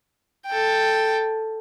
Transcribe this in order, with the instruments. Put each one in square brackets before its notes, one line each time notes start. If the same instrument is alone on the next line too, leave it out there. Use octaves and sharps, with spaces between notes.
[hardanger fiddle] A4 G5